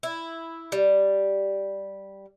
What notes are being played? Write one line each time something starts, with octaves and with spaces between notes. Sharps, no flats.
E4
G3